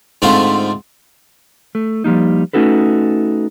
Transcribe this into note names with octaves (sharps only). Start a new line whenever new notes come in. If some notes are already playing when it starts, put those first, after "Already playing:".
G#2 D3 A3 C4 F4
A3
F3 G3 A#3 D#4
A3 C#4 D#4 F#4 A4 B4